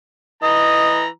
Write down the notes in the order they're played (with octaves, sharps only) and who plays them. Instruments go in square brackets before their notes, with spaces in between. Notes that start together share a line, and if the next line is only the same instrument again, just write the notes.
[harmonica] E3 A#5 [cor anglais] D#5